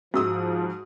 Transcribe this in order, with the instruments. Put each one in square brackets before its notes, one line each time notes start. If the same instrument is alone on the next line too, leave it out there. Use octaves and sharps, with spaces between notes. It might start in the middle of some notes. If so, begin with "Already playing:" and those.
[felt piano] G#2 D#6 [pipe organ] F3 [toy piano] F#4 E6